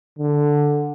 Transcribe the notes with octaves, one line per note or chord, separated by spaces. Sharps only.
D3